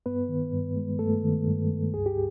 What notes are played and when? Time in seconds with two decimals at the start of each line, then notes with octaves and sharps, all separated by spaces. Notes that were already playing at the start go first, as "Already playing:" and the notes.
0.06 G2 B3 B4
0.29 D#3
0.52 G2
0.76 G#3
0.99 G2 A3 A4
1.24 D#3
1.47 G2
1.71 G2
1.94 C#2 G#4
2.06 G4